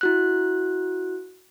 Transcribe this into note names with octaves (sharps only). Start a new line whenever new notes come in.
E4 F#4 F#6